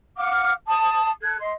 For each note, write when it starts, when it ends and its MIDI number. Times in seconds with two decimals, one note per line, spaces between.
0.17 0.51 77
0.17 0.51 78
0.17 0.51 86
0.17 0.51 89
0.67 1.10 81
0.67 1.10 87
1.22 1.36 69
1.22 1.36 90
1.22 1.36 92
1.39 1.53 75
1.39 1.53 84